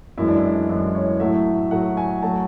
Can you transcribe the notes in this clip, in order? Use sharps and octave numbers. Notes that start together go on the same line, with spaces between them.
F#2 E3 G#3 E4
D4
E4
F#2 E3 G#3 E4
C#5
A2 F#3 A3 E5
A2 F#3 A3 F#5
G#5
F#3 A3 A5